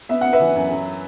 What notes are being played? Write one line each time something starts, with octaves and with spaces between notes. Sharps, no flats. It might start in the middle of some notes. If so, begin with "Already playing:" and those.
B3 E5
B3 F#5
B4 E5
E3
F#2
F#3